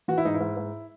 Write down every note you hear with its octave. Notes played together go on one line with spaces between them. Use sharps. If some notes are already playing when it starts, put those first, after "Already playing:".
E3 F#4
E4
G#2 D#4
E4
G#2
G#2